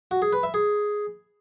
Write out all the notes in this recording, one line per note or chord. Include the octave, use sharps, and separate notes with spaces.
F#4
G#4
B4
E5
G#4